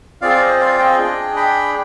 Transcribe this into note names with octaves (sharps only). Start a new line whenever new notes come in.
C4 F4 G#4 D5 F5
C5 D#5
D5 F5
D#5 G5
D4 G#4
G5 B5